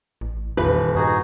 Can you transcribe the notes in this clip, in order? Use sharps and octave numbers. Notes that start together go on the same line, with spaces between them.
A1
D#1 E2 B4
G2 D#4 F#4 G#4